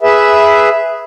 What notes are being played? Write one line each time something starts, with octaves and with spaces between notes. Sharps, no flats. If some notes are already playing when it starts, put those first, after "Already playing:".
G#4 B4 E5